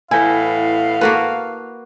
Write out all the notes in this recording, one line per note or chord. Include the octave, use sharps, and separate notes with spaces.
A2 E3 B3 E4 F5 G#5
A#3 F#4 A4 B4